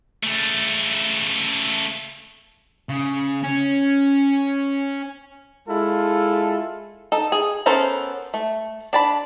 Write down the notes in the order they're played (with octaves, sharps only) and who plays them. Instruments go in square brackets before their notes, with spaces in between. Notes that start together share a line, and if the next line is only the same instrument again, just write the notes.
[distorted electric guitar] C#3 A3
C#3
C#4
[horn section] G#3 E4 F4 A4
[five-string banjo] D#4 A4
G#4
B3 C#4 A4 A#4 C5
A3
D4 A5 B5